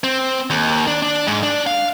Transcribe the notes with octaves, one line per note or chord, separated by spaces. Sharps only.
C4
D#2
D4
D4
G#2
D4
F5